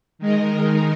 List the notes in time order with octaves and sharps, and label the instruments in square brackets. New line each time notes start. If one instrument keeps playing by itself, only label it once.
[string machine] D#3 G#3 D#4 A#4